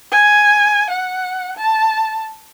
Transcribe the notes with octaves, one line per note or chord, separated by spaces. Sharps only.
G#5
F#5
A5